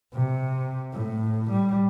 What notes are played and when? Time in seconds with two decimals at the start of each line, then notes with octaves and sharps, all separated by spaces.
0.14 C3
0.92 A2
1.51 G3